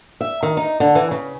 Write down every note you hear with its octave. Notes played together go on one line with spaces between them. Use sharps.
E5
D#3
D#4
D3
E3
C#3